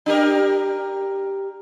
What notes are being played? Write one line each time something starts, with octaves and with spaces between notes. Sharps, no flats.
D4 G4 A#4